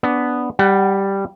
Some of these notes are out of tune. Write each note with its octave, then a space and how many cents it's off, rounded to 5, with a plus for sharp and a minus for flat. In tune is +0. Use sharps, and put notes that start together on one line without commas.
B3 +0 D4 -10
G3 +0 F#5 +35